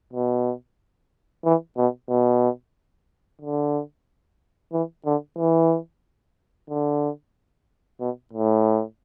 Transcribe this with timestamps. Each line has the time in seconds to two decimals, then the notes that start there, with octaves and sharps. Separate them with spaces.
0.13 B2
1.45 E3
1.77 B2
2.10 B2
3.42 D3
4.73 E3
5.06 D3
5.38 E3
6.70 D3
8.00 B2
8.33 A2